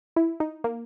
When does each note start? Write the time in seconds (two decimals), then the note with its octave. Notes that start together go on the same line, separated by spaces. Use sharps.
0.16 E4
0.40 D#4
0.64 A#3